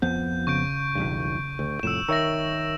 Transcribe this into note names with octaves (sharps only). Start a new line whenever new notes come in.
F2 F3 B3 G6
C#3 C#6 G6 D7
B1 E2 G2
D2
C2 F2 A2 E6 E7
D#3 A#4 C#5 E5 E6 A#6